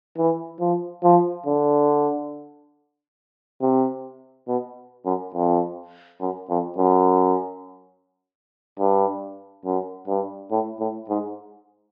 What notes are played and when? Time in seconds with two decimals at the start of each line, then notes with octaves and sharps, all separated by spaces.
0.17 E3
0.60 F3
1.03 F3
1.46 D3
3.62 C3
4.48 B2
5.06 F#2
5.34 F2
6.21 F#2
6.50 F2
6.78 F#2
8.79 G2
9.65 F#2
10.08 G2
10.51 A2
10.80 A2
11.09 G#2